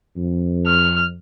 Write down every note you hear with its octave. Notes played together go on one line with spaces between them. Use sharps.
F2
F6